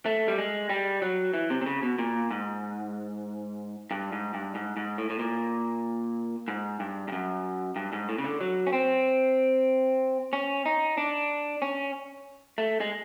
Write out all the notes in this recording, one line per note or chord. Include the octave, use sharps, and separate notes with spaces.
A3
G3
G#3
G3
F#3
E3
C3
C3
C#3
B2
A#2
G#2
G2
G#2
G2
G#2
G#2
A2
A2
A#2
G#2
G2
G2
F#2
G2
G#2
A2
C#3
D3
F#3
C#4
C4
C#4
D#4
D4
C#4
A3
G#3